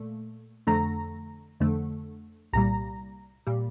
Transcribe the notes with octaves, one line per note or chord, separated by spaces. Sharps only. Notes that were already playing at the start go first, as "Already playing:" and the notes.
Already playing: A#2 A3
F2 D3 A3 A#5
F2 D3 A3
C2 A#2 G3 A#5
A#2 G3